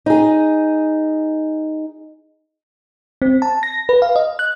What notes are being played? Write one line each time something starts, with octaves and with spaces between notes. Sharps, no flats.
D#4 G#4
C4
A5
A#6
B4
F5
D#5
F#6